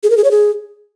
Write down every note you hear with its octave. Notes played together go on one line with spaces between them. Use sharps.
G#4
A#4
G#4
C#5
G#4